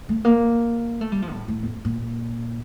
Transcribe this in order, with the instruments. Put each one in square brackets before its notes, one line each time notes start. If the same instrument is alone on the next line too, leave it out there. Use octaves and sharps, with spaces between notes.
[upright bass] A3
A#3
A3
G3
F3
A2
A2
F2
A#2